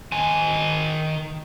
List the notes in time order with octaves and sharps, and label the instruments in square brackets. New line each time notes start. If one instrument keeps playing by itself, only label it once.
[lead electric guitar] D#3 G#5